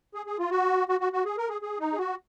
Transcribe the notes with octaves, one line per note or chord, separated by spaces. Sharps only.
G#4
G#4
F4
F#4
F#4
F#4
F#4
G#4
A#4
G#4
G#4
D#4
G#4
F#4